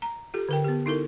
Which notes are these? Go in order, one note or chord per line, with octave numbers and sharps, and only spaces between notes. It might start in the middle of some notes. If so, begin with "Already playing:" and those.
A#5
F4 G4 A4
D3 A#4 G5
B3 G4
D#4 E4 A4 A#4